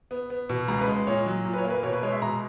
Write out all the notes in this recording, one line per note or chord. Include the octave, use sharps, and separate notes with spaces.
B3
B3
B2
C#2 A#5
B4
G#3
A#2 C#5
F#3
A#2
B4
C#5
A#3
B4
B2 C#5
B4
G#3 C#5
E5
B2 A#5